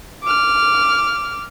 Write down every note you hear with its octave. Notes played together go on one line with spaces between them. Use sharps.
D6 F6